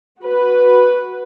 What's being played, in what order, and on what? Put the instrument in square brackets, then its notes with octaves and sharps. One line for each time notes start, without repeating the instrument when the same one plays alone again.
[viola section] F#4 B4